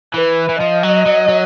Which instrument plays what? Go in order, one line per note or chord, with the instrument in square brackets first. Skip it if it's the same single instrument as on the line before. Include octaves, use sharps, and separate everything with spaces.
[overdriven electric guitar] E3 [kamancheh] B4
[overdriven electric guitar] E3
[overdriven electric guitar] F3 [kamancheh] D#5
[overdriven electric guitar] F#3
F#3
F#3